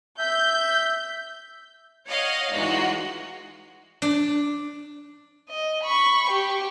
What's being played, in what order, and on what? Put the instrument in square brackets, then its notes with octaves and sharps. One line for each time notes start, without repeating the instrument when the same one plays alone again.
[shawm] E5 [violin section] G6
[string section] C#5 D#5 F5 F#5
E3 G#3 D#4 F4 F#4
[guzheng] D4
[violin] D#5
B5 C#6
G4